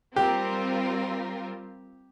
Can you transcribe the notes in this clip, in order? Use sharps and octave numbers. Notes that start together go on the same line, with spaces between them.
G3 C4 F4 G4 A#4